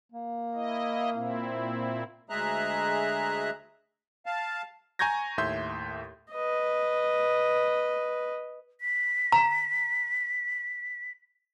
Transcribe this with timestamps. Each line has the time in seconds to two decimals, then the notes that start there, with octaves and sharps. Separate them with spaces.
0.12 A#3
0.54 E4 D#5
1.14 A#2 C4 E4
2.30 D2 G#3 G#4 E5 A#5 F#6
4.26 F5 A5
4.99 G#5 A#5 C#6 G6 G#6 A#6
5.38 D#2 A2 E5 C6 G6
6.33 B4 D#5
8.81 B6
9.32 A#5